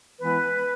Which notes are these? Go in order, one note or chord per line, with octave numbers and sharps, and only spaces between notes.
E3 G#3 B3 E4 B4